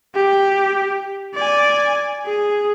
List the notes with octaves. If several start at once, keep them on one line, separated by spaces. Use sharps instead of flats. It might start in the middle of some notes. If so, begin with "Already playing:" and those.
G4
D5 G#5
G#4